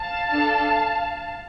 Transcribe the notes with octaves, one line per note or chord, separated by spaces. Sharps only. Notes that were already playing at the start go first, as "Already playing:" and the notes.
Already playing: F5 A5
D4 A4